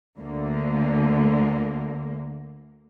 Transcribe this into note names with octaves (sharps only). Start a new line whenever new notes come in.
D2 D3 A#3